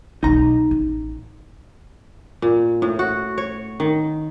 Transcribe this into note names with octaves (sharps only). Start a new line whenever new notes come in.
B1 G#3 D#4 A#5
A1
A#2
A2
F#4
C#5
D#3